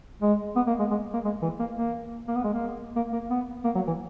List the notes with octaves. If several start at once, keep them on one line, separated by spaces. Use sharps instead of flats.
G#3
B3
A#3
G#3
G#3
A#3
G#3
E3
A#3
A#3
A#3
B3
G#3
A#3
A#3
A#3
B3
A#3
F#3
E3